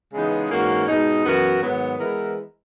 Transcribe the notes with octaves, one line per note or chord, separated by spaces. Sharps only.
C#3 E3 G#3 B3 D#4
G#2 E3 A#3 C#4 F#4
B2 G#3 D#4
F#2 E3 B3 F#4 A#4
G#2 D#3 F#3 B3
E3 G#3 B3 E4 A#4